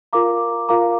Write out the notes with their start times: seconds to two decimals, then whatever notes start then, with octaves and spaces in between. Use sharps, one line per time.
0.13 F4 A#4 F5 A#5 D6
0.69 F4 A#4 F5 A#5 D6